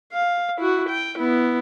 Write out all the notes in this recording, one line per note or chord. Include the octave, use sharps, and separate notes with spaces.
F5
E4 F#4
G5
B3 E4